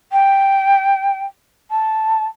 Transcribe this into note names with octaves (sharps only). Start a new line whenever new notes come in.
G5
A5